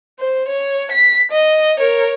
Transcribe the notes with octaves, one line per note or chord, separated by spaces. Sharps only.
C5
C#5
B6
D#5
A#4 C#5